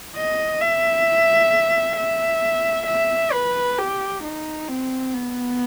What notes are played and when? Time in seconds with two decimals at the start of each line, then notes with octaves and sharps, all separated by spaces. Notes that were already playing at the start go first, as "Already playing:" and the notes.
0.16 D#5
0.61 E5
1.97 E5
2.87 E5
3.33 B4
3.78 G4
4.24 D#4
4.68 C4
5.13 B3